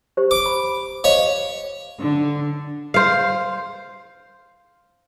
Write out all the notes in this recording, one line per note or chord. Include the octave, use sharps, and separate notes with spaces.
G4 C5
D6
B5
C5 C#5 D#5 F5
D3
C5 F5